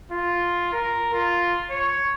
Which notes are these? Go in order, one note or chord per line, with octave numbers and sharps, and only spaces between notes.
F4
A#4
F4
C#5